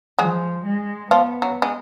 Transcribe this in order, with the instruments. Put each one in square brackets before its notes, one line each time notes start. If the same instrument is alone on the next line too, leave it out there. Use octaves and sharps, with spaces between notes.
[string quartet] F3 [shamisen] G#3 G#4
[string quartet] G#3
[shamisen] F3 F4 [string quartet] B3
[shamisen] F#3
G#3